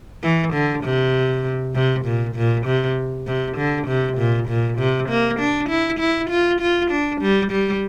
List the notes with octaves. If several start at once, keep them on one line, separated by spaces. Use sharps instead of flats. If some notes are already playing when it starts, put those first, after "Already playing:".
E3
D3
C3
C3
A#2
A#2
C3
C3
D3
C3
A#2
A#2
C3
A#3
D4
E4
E4
F4
F4
D4
G3
G3